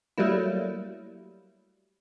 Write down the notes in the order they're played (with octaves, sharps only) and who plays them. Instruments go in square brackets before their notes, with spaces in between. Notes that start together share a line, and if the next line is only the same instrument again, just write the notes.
[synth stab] F#3 G3 A3 A#3 E4